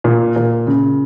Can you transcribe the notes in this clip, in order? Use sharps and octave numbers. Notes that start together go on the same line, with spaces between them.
A#2
A#2
C#3